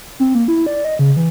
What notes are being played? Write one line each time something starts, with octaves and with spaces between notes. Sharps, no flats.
C4
A#3
E4
D5
D#5
C#3
E3